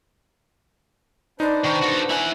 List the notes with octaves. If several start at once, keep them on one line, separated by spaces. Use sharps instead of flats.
D4 D#4 B4 C5 D5
D#3 C#6
F#4 A4
E4 F#5 G#5